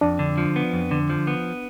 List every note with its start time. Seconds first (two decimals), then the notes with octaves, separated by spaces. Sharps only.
0.01 F2 D4
0.19 D3
0.38 F3
0.56 B3
0.73 F2
0.91 D3
1.10 F3
1.27 B3